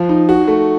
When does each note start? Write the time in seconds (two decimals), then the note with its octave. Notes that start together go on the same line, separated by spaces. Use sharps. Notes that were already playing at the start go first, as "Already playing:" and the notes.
Already playing: F3
0.09 D#4
0.29 F#4
0.48 A3